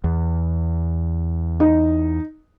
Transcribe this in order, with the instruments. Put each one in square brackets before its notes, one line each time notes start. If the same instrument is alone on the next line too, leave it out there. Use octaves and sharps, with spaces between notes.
[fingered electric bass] E2
[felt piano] D#4